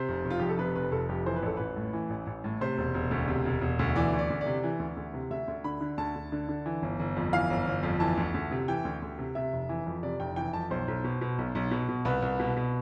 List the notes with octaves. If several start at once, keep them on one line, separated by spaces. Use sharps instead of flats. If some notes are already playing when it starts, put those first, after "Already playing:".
Already playing: C3 C5
F1
F1
F4
F2 G4
A4
C3 B4
F1 B4
F1 A4
F2 G4
E3 C5
B4
A1 A4
A1 B4
A2
E3
A1
A1
A2
C3 C5
E1
E1
D2
C3
E1
E1
D2
E3 D5
D2
D5
D2
D5
C3
E3
D2
D2
C3
D2 E5
D2
D3 B5
D3
D2 A5
D2
D3
D3
E3
G1
G1
F2
E3 F5
G1
G1
F2
E3 A5
D2
D2
C3
E3 G5
D2
D2
C3
C3 E5
F1
E3
F2
C3 D5
F1 G5
E3 G5
F2 A5
B1 C5
B1
B2
B2
B1
B1
B2
B2
C2 B4
C2
B2
B2